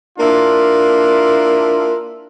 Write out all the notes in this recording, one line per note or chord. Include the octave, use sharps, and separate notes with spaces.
A#3 D4 E4 F4